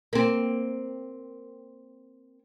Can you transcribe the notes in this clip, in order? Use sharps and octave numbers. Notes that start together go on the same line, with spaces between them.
A#3 C4